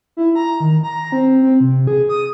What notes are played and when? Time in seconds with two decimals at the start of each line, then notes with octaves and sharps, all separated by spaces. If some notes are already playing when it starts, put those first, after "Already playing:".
0.17 E4
0.36 A#5
0.60 D#3
0.83 A#5
1.12 C4
1.43 C4
1.60 C3
1.87 G#4
2.09 D#6